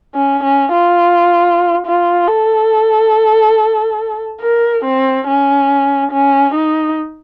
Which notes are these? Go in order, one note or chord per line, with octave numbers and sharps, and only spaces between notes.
C#4
C#4
F4
F4
A4
A#4
C4
C#4
C#4
D#4